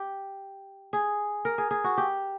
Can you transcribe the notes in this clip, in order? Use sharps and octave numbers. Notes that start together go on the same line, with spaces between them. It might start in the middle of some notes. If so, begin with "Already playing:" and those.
Already playing: G4
G#4
A#4
G#4
G#4
F#4
G4